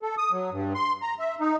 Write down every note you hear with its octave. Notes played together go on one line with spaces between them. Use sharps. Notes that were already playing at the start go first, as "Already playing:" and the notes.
A4
D#6
F#3
G2
C6
A#5
E5
D#4